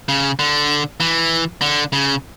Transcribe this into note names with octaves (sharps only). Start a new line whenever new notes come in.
C#3
D3
E3
D3
C#3